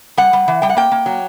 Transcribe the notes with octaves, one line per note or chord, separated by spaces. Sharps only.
G3 F#5
G3
E3
G3 G5
F#5
A#3 G5
A#3
F#3